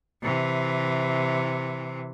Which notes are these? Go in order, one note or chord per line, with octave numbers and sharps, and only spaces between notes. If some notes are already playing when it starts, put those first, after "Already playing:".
C3 E3